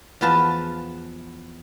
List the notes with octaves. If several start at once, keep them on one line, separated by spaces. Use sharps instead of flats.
E2 F3 B3 F4 B4 A5